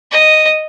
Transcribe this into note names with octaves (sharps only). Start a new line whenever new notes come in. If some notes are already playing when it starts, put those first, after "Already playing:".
D#5